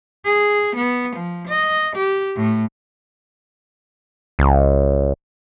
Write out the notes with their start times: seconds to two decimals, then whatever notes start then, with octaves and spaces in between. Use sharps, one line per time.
0.25 G#4
0.75 B3
1.15 F3
1.47 D#5
1.96 G4
2.35 A2
4.39 C#2